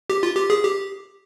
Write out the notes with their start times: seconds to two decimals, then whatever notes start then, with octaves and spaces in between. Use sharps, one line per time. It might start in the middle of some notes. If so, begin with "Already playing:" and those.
0.10 G4
0.23 F4
0.37 G4
0.50 G#4
0.63 G4